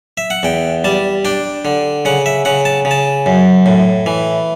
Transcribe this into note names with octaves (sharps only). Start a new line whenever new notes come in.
E5
F#5
E2 G5
G3 A5
D4 G5
D3
C#3 F#5
E5
C#3 F#5
A5
C#3
A5
F#2
A2
E3